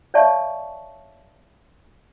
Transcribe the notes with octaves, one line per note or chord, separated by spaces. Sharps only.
C#5 D5 E5 F5 A5 C#6